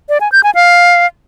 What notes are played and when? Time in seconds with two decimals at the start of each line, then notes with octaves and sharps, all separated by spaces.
0.09 D5
0.21 G#5
0.32 G6
0.43 G#5
0.55 F5